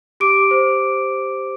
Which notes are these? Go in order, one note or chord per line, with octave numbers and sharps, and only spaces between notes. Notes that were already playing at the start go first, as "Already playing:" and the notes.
G4 D6 D7
C5